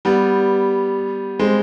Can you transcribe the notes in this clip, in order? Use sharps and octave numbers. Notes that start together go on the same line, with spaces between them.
G3 B3
G#3 C4